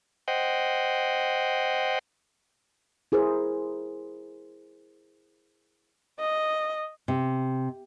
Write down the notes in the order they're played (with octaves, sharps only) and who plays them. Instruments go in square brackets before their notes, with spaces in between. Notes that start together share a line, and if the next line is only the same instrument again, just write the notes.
[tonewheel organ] C5 D#5 F#5 G5
[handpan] E4 G#4 A#4 C5
[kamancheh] D#5
[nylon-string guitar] C3